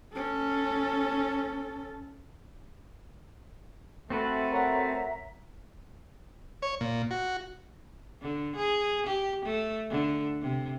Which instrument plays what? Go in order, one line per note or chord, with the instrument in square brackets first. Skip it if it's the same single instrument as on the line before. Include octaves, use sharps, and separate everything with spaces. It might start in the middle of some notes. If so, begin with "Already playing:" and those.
[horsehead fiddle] C#4 A4
[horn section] A3 [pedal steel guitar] C4 F#4 B4
[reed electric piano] A#4 C#5 F#5 [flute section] E5 A#5
[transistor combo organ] C#5
A#2
F#4
[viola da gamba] D3
G#4
G4
A3
D3
C3